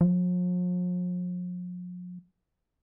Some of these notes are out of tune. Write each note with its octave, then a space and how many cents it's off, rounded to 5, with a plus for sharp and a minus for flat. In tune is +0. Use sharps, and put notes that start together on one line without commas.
F3 +45